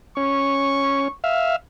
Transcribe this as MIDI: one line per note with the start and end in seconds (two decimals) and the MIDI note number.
0.17 1.08 61
0.17 1.14 85
1.24 1.56 76
1.24 1.56 77